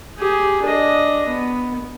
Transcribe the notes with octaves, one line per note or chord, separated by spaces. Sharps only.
G4 G#4
D4 D#5
B3